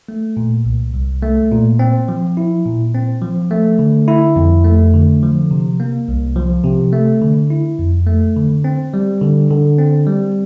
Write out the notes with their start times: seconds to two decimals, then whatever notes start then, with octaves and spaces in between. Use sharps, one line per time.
0.09 A3
0.37 A#2
0.65 C2
0.95 C2
1.22 A3
1.51 A#2
1.79 C4
2.09 F3
2.37 E4
2.66 A#2
2.94 C4
3.22 F3
3.51 A3
3.79 D3
4.08 E4
4.36 F2
4.64 A3
4.94 D3
5.23 F3
5.51 C3
5.80 A#3
6.08 C2
6.36 F3
6.64 C3
6.93 A3
7.21 D3
7.50 E4
7.79 F2
8.07 A3
8.36 D3
8.64 C4
8.94 G3
9.22 D3
9.51 D3
9.78 C4
10.07 G3